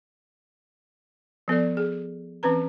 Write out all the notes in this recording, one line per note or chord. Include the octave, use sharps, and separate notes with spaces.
F3 B3 A4 D5
G#4
E3 C4 C#4 B4 A#5